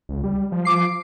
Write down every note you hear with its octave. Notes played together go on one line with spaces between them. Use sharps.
C#2
G3
F3
D6 C7